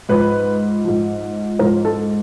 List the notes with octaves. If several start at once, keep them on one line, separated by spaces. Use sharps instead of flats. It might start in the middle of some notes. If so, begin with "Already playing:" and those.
G#2 F3 B4
G#2 F3
G#2 F3 A#4
A4